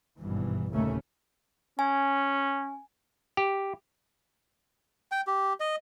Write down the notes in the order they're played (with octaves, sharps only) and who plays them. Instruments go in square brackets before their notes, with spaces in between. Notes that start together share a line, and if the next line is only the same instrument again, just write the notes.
[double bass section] G#1 G2 B2 E3
G1 D#2 A#2 C#3 A3 C#4
[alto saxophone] C#4 [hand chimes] G#5
[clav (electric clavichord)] G4
[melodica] G5
G4
D#5